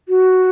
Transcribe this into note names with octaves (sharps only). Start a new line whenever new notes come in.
F#4